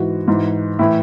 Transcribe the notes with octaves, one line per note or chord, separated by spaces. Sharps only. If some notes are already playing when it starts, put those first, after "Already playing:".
Already playing: G#2 E3 F#4
G#2 E3
A2 E3 E4